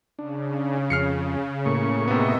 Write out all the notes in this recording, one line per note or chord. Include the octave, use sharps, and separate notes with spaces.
C#3 D4
F2 F6 C7 C#7
A2 A#3 C#6
C3 B3 D#5 E5